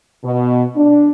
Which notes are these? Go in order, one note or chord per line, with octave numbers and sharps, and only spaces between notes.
B2
D4